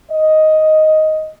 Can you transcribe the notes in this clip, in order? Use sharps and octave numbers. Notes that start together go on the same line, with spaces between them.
D#5